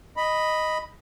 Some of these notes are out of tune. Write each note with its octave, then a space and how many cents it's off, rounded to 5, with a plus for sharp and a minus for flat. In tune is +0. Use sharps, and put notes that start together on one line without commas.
D#5 +0 B5 +0